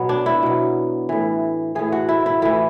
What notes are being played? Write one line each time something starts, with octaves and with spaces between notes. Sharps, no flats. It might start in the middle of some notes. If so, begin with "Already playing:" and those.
Already playing: B2 F#3 B3
D4
E4
B2 F#3
A2 E3
A2 E3 G#4
F#4
E4
E4
A2 E3 E4